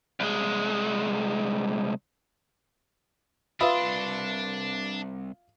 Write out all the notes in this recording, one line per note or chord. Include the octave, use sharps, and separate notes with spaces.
C2 G#3
C2 D4 F4 B4 E5 B5 C6 D#6